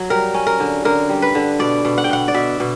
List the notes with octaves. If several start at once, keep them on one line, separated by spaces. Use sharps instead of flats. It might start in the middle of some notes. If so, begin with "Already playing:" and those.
Already playing: F#3
G3 A#4
C#4
A#4
D3
D3 A#4
G3
B4
D3
B2 D5
B2
F#5
G5
B2 F#5
D5
B2 E5
B2